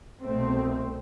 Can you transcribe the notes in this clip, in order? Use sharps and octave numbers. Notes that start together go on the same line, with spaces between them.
C2 B2 A3 C4